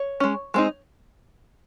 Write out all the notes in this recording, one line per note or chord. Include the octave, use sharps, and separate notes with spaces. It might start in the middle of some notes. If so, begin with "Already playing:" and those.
Already playing: C#5
G#3 C#4
G#3 C4 D#4